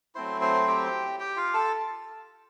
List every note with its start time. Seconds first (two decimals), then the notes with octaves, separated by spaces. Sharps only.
0.15 F#3 A3 C4 E4 C5 C6
0.41 C5 C6
0.67 G4 G5
1.20 G4 G5
1.37 F4 F5
1.54 A4 A5